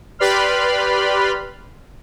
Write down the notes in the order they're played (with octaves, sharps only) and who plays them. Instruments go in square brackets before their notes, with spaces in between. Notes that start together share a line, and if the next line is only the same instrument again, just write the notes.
[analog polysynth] G4 B4 D5 B5 C6 F6